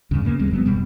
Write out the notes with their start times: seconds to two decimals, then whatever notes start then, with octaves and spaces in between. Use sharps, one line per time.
0.11 E2 G2 C#3
0.25 C#3 A#3
0.39 D#2 G3 G#3 C4
0.51 G1 F#3 B3
0.66 F1 B2 G3